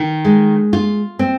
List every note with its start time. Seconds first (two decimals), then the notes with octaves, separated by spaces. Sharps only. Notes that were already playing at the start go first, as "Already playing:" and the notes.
Already playing: D#3
0.25 G#3
0.73 F4
1.19 C4